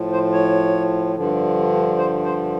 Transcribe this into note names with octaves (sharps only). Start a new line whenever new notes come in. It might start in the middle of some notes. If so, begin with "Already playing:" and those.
Already playing: A2 F3
C5
C#5
G2 D3 F3
C5
C5